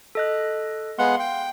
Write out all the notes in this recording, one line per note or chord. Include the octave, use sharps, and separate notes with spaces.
A4 D#5 F#6
G#3 B3 F5 F#5 C6
G5